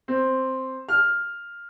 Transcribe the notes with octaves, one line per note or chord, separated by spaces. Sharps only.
C4
F6